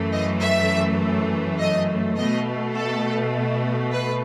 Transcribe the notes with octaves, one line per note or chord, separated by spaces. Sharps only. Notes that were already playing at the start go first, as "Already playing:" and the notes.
Already playing: F#2 E3 A3
D#5
E5
D#5
B2 A3 D#5
A4
B4